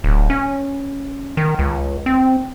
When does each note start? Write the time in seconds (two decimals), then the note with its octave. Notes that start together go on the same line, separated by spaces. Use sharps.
0.04 D1
0.30 C#4
1.37 D#3
1.59 C#2
2.06 C4